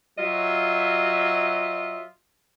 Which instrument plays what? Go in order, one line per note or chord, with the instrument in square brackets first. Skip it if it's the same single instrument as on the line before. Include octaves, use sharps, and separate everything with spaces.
[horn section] F#3 F4 D#5 E5